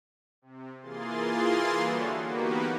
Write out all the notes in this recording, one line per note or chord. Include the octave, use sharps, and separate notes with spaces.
C3
E3 A#3 F4 G#4 C6 A6
D3 E3 G3 F#4 A4 C#5
A#3 B3 D#4 F#4 G4 B4